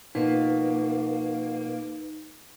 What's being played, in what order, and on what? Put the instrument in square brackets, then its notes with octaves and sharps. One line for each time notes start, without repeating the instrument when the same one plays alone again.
[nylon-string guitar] B2 F3 [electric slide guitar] A#3 [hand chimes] D#4 [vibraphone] B4